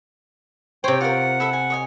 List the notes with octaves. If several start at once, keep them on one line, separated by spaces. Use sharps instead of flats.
C3 C5 C#5 G5
F4 A#4 F#5
E4 A4 E5
G#5
C#5 D#5 G#5